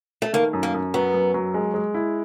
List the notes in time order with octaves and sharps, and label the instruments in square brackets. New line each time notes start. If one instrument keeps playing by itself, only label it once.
[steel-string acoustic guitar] A3
[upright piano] D#3 [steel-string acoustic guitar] A#3
[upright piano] F#2
[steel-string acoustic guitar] A#3
[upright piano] F#2
[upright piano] F#3 [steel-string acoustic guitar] B3
[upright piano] F#2
F#3
G#3
G#3
E4